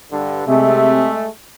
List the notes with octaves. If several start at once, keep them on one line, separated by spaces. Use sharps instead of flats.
G2 D3
C3 G#3 A3 E5